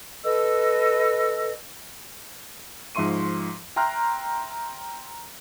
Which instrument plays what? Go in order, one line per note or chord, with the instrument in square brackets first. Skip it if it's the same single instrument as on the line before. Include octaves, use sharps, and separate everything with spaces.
[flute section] A4 B4 D#5 E6
[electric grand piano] G#2 F3 E5 C6 C#6 D#7
E5 G5 A#5 C6 F6 F#6